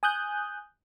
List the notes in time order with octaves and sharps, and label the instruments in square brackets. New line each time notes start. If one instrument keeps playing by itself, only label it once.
[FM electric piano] G#5 D#6 F#6 G6